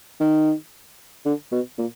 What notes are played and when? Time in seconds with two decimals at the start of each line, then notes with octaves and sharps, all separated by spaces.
0.20 D#3
1.25 D3
1.52 B2
1.78 A#2